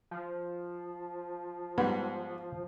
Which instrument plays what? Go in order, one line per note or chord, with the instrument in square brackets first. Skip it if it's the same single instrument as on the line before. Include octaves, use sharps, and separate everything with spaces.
[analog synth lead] F3
[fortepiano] G#2 G3 [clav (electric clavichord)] B3